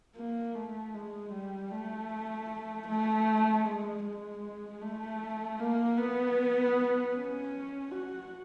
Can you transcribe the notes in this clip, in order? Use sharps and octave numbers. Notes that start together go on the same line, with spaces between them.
A#3
A3
G#3
G3
A3
A3
G#3
G#3
A3
A#3
B3
C#4
F#4